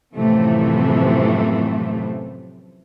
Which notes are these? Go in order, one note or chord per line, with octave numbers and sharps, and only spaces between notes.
F#2 A2 C3 E3 F3 A3